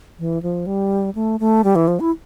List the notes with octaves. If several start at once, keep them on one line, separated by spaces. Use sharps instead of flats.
E3
F3
G3
A3
A3
G3
E3
F3
E4